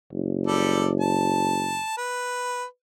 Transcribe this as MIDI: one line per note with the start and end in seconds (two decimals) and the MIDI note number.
0.12 1.80 30
0.47 0.88 55
0.47 0.88 69
0.47 0.88 74
1.00 1.94 81
1.98 2.64 71